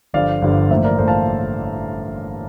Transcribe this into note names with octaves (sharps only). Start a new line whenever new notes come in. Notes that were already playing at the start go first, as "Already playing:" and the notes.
G1 G2 D3 F3 D5 F5
G1 G2 D3 F3
A1 A2 F3 A#3 C5 E5
A#4 D5
A1 A2 F3 A#3 A4 C5
F5 A5